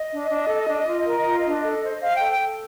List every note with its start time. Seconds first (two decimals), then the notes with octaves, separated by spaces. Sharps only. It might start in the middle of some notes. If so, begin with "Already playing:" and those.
Already playing: D#5
0.12 D4
0.31 D4
0.49 A4
0.68 D4
0.87 F4
1.06 A#4
1.25 F4
1.45 D4
1.63 A4
1.83 C5
2.01 C5 F5
2.16 A4 G5
2.31 G5
2.39 A4